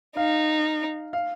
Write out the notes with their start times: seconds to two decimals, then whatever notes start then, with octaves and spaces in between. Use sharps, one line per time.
0.17 D#4 F5
1.13 F5